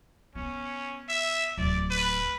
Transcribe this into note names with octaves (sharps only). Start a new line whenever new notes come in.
B3 C#4
E5
D1 D5
B4